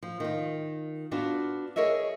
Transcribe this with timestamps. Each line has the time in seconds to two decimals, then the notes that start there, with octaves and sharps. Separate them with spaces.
0.03 F3
0.20 D#3 F4
1.11 B3 D4 F4 F#4
1.76 G#4 A#4 C#5 D#5 E5